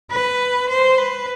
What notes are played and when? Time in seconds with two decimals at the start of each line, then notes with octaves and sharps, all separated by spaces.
0.11 B4
0.69 C5
0.98 B4